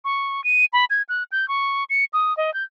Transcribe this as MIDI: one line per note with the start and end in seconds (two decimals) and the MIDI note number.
0.05 0.43 85
0.44 0.65 99
0.73 0.85 83
0.90 1.02 92
1.09 1.23 90
1.32 1.48 91
1.48 1.84 85
1.90 2.05 97
2.13 2.36 87
2.37 2.53 75
2.54 2.63 91